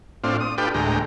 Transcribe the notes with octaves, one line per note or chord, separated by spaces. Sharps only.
A2 C4 D4 F4
D#6
D4 F4 G4 A4 B4 G5
D2 A2 G#3 G5 A#5